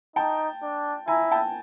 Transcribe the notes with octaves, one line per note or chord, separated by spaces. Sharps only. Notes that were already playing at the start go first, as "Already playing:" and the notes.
D#4 G5 A5
D4
E4 G#5 A#5
G5 A5